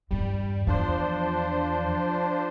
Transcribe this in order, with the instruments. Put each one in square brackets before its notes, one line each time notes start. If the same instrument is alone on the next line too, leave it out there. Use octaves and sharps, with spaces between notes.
[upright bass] E2 G2 [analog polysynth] G3
[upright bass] E2 [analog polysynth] F3 D4 C5